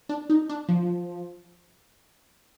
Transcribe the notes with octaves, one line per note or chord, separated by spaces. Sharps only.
D4
D#4
D4
F3